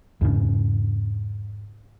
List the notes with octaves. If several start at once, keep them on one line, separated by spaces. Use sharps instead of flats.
E2 G#2 C#3 D4